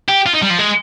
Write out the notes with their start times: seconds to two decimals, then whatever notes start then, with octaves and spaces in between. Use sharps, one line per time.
0.09 G4
0.26 F4
0.33 D#4
0.42 G3
0.50 F3
0.58 G#3